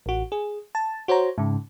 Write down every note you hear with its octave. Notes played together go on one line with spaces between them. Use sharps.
A1 F#4
G#4
A5
F#4 C5 C#5 A#5
G#2 C#3